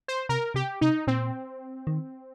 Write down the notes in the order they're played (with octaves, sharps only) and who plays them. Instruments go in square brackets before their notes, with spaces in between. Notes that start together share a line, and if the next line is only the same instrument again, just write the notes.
[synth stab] C5
[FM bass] C3 [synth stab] A#4
[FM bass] C3 [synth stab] G4
[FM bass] C3 [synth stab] D#4
[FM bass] A#2 [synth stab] C4
[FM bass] D#3